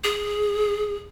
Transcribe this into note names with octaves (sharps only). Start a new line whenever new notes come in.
G#4